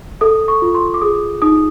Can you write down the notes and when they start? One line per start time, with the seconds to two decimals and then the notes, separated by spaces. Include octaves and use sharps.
0.21 A4 D#6
0.48 C#6
0.62 F4
0.75 C6
0.94 D6
1.01 G#4 D#6
1.42 D#4 D#6